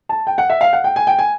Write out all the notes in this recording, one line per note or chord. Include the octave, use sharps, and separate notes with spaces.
A5
G5
F#5
E5
F5
F#5
G5
G#5
G5
G#5